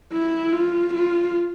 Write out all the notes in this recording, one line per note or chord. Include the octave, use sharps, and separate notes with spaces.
E4
F4
F4